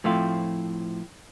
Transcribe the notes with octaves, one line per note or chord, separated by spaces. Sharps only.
A2 F3 A3 C4 F4